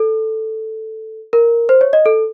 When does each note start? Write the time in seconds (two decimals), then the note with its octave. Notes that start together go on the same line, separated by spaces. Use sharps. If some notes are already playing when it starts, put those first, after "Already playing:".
Already playing: A4
1.33 A#4
1.69 C5
1.81 C#5
1.93 D#5
2.06 A4